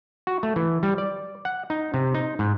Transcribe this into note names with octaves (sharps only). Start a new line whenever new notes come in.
F#4
A3
E3
G3
D5
F#5
D#4
C3
D#4
G#2